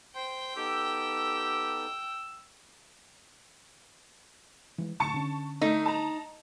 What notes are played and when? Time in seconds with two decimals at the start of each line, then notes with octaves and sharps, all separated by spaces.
0.16 C5 G5
0.56 B3 D#4 G4 A4 E6
4.78 E3 G#3
5.00 D1 D2 A5 C#6 C#7
5.14 D3 C#4
5.61 A3 D#4
5.86 A5 A#5